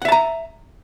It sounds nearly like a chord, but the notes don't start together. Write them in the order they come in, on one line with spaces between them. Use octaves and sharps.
F#5 E5 A5 A#5